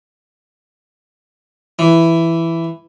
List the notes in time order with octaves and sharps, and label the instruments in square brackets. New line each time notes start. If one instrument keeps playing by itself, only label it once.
[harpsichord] E3